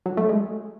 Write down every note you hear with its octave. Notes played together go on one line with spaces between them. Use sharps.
F#3
A3
G#3